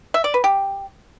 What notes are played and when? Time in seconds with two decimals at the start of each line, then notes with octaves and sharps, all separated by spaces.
0.14 E5
0.24 D5
0.34 B4
0.44 G4